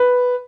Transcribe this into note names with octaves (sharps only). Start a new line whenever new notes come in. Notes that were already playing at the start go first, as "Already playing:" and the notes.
Already playing: B4